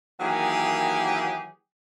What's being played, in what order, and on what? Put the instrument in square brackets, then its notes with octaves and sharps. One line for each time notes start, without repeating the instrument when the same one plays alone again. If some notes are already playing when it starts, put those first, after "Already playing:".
[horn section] D#3 E3 F#3 A#3 G4 G#4